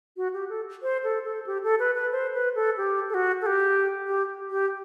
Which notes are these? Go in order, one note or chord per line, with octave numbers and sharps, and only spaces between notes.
F#4
G4
A4
C5
A4
A4
G4
A4
B4
B4
C5
B4
A4
G4
A4
F#4
A4
G4
G4
G4